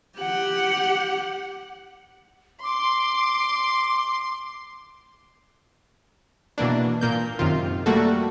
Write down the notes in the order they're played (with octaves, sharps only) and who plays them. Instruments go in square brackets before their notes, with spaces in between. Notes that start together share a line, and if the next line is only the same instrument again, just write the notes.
[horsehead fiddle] G4 F#5
[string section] C6 [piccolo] D6
[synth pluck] B2 E3 A#3 D4
A#2 A#3 G6
F#2 C3 D#3 F4
G3 A3 A#3 F#4 A4